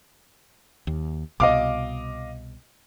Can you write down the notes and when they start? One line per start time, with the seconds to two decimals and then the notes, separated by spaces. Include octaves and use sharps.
0.87 D#2
1.40 C2 B2 D#5 F5 D6